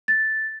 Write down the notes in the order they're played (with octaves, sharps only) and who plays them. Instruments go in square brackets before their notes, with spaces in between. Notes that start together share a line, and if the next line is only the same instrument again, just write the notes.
[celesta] A6